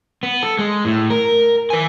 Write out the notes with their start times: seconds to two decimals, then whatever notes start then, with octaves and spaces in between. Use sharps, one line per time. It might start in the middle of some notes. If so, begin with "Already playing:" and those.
0.23 B3
0.43 A4
0.59 G#3
0.85 A2
1.10 A#4
1.70 B4 G#5